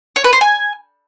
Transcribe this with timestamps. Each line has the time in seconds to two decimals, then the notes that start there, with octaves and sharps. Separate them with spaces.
0.16 C#5
0.24 B4
0.33 C5
0.41 G#5